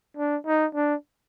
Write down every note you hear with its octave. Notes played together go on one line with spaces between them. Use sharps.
D4
D#4
D4